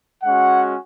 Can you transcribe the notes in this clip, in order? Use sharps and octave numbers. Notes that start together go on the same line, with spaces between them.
G#3 C#4 F#4 F#5